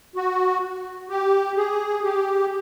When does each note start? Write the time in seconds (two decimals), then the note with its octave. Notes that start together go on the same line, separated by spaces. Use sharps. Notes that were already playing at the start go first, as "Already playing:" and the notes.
0.16 F#4
1.09 G4
1.57 G#4
2.04 G4